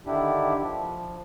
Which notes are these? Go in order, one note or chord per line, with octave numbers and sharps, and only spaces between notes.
D3 D#3 D4 E4 G4
F3